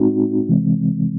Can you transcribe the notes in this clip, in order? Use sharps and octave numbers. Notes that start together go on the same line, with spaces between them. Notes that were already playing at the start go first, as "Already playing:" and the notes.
Already playing: A2 G#3 C4 D#4 F#4
C3 E3 G#3 C4